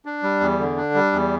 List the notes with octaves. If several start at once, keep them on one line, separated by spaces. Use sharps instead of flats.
D4
G3
E2
D3
D4
G3
E2